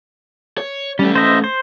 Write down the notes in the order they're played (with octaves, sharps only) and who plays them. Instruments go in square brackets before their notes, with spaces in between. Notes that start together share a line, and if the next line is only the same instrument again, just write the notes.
[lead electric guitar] C#5
[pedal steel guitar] G3 [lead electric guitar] A3 C#4
[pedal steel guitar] C5 D#5 E5
C5